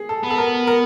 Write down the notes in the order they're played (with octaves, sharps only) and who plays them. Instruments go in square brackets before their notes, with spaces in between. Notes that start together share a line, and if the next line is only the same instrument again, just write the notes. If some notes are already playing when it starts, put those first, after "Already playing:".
Already playing: [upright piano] G#4
A4
[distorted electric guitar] B3
[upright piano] A4
A#4
A#4